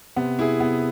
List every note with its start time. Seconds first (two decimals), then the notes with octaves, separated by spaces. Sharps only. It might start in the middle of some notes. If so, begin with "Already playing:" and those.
0.16 C3 B3
0.39 E4 G#4
0.60 B3